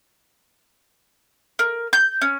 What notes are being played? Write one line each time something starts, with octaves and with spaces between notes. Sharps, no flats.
A#4
G6
C#4